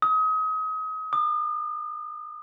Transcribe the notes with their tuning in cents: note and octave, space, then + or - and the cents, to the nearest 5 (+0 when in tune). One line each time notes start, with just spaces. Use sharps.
D#6 +30
D#6 -45